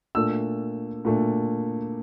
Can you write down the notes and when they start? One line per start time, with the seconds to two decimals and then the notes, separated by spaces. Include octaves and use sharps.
0.15 A#2 A3 D4 E6
1.05 A#2 A3 D4